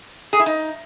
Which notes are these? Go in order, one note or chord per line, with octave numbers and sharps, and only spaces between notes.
G#4
E4
D#4